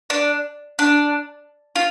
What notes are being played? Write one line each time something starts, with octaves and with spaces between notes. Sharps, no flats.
D4
D4
F4